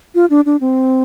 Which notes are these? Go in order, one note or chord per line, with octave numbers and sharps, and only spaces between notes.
F4
D4
D4
C4